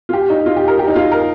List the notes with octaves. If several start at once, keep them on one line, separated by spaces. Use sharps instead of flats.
F4
G4
D#4
F4
G4
A#4
G4
D#4
F4
A#4